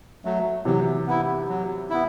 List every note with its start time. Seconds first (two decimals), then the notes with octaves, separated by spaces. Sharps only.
0.25 F#3 A3
0.65 C3 E3 F#3
1.07 B3 E4
1.49 F#3
1.90 B3 E4